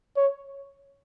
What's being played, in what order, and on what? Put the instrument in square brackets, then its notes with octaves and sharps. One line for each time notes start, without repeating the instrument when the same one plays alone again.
[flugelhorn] C#5